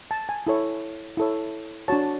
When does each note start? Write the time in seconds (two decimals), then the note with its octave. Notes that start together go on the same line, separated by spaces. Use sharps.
0.11 A5
0.29 G#5
0.47 E4 A4 C#5
1.17 E4 A4 C#5
1.88 D4 F#4 C#5 A5